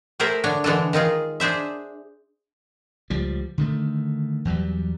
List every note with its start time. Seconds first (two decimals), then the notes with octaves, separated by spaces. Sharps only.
0.20 A3 G#4 A#4 C5 E5
0.44 D3 D4 C#5
0.64 D3 E3 G#3 D4 A4
0.93 D#3 D#4 F4 G#4
1.40 D4 G#4 C5 E5
3.10 C#2 F3 G3
3.58 D3 D#3 A3
4.45 E2 F#3 G3